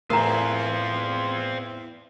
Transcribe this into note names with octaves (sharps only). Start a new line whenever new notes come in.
E2 A2 C4 F4 A#4 A#5